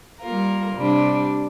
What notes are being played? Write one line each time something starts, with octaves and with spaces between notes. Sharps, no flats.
G3 A#3 F4 A#4
C3 G3 D4